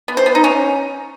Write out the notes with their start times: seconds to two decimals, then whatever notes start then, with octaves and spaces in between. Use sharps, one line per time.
0.08 B3
0.17 C5
0.26 B3
0.35 D#4
0.44 C#4